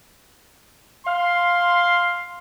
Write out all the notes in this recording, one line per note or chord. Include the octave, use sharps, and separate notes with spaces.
F5 C6